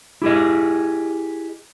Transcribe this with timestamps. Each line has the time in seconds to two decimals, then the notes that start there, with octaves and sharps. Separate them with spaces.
0.22 E4 G4 G#4 D#5